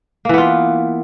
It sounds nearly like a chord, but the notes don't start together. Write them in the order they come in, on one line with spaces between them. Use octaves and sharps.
A#3 E3 B3 F4